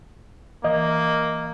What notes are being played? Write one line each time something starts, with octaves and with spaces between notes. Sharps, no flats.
E3 A#3 D#5